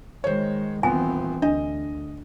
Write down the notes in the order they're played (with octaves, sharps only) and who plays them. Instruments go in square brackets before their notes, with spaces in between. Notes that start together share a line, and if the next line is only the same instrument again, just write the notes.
[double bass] D#3 G#3 [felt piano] C5 C#5
[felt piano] D#1 B3 [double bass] E3 C4 [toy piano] G#5
[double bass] D2 [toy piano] D4 [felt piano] D#5